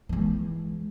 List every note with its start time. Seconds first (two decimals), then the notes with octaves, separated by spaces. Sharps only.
0.09 E3 G#3